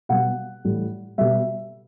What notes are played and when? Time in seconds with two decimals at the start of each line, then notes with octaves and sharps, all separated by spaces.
0.09 B2 G3 F#5
0.65 A2 E3 G3
1.18 B2 G3 E5